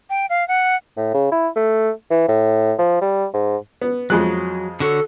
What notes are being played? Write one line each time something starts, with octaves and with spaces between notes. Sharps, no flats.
G5
F5
F#5
A2
C#3
E4
A3
E3
A2
F3
G3
G#2
B3
F2 F#3 G#3 F#6
D3 F#4 A4 C#5